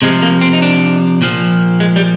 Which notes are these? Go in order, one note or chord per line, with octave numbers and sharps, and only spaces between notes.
C3 F3 G#3
A#3
C4
D#4
D4
A#2 F3
G#3
G3